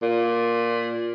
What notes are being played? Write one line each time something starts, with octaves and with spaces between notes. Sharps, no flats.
A#2